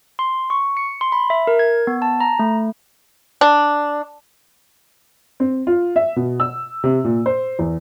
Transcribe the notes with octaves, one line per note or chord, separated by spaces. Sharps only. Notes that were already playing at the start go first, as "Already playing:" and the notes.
C6
C#6
C#7
C6
B5
E5
A#4
G#6
B3
A5
A#5
A3
D4
C4
F4
E5
B2
E6
C3
A#2
C5
E2